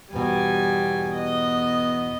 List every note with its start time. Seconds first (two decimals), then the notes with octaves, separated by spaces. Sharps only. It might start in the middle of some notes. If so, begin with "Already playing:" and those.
0.13 E2 G#2 B2 G3 G#5
1.14 B3 D#5